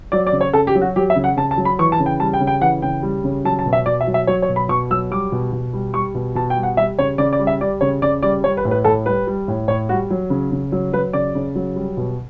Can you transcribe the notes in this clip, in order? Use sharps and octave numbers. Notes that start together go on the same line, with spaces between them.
F#3 D5
D5
C#3
C#5
C#3 A4
G4
F#3
F#4
F#3 G4
E5
C#3
F#5
C#3 A5
A5
F#3
B5
E3 C#6
A5
C#3
G5
G3 A5
G5
C#3
G5
E3 F#5
C#3 G5
G3
C#3
F#3 A5
A5
B2
E5
B2 D5
E5
F#3
E5
F#3 C#5
C#5
B2
B5
B2 C#6
F#3 E6
G3 D6
B2
B2
G3
G3 C#6
B2
B2 A5
G5
G3
F#5
G3 E5
C#3 C#5
C#3 D5
D5
G3
E5
G3 D5
C#3 C#5
C#3 D5
G3 D5
G3 C#5
B4
A2
B4
A2 A4
G3 B4
G3
A2
A2 C#5
G3 F#4
F#3
C#3
C#3
F#3
F#3 B4
C#3 D5
C#3
F#3
G3
B2